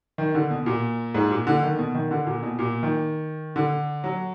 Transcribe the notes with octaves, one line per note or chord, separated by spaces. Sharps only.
D#3
D3
B2
A#2
G#2
A#2
D3
D#3
B2
D#3
D3
A#2
B2
A#2
D#3
D3
F#3